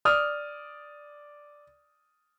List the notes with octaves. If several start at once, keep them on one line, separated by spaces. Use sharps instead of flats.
D5 D#6 F6